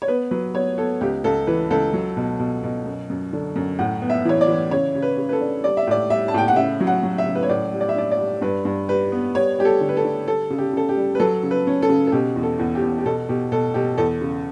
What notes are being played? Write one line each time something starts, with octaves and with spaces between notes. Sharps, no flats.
C#5
B3 B4
F#3 B4
B3 C#5
B3 A4
C#2 G4
C#2 A4
E3 B4
C#2 A4
F#3
B2
B2
B2
F#2
F#2
D3
F#2
A2 F#5
B3
E5
E3 C#5
D5
E3
C#3 C#5
C#3
B4
C#3
B4
A4
D4
G3 D5
E5
A2 D5
G3 E5
A5
A2 G5
F#5
C#3 E5
F#3
F#5
F#3
E5
C#3
B4
C#5
A2 D5
G3
D5
E5
D4 D5
D5
G3
G2 B4
G2
G3 B4
B3
G3 C#5
G3 G4
A4
D3
B4
A4
D3
G3 A4
C#3
G4
C#3 A4
G4
G3
B4
F#3 A4
C#3
B4
C#4
A4
C#3
A4
B2 G4
E2
A4
E2
G4
E2
G4
B2 A4
B2 G4
B2 A4
B2 G4
E2 A4
C#3